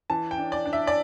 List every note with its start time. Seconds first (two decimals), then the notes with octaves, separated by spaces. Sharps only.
0.10 E3 A5
0.31 G5
0.38 D4
0.52 D5
0.66 D4
0.73 E5
0.87 D5